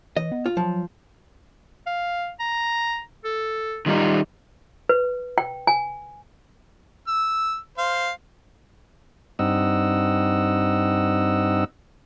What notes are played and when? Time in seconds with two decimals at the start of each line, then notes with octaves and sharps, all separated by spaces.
0.17 E3 D#5
0.32 B3
0.46 F4
0.57 F3 F#3
1.87 F5
2.40 A#5
3.25 A4
3.86 D#3 G3 D#4 F4
4.89 B4
5.38 G5
5.67 G#5
7.08 E6
7.78 C5 F5
9.39 G2 C4 D#4 D#5 F#5 E6